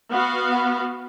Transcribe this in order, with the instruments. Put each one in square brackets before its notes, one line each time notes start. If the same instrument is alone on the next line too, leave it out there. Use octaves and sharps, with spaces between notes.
[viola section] B3 F#4 F5